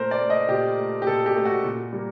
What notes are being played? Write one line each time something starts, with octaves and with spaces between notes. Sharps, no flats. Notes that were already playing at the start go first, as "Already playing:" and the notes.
Already playing: A#2 A3 A#4 C5
D5
A3
D#5
A#2 G4
A3
G4
A#2 A4
G4
A3
F#4
A#2
G3 A#3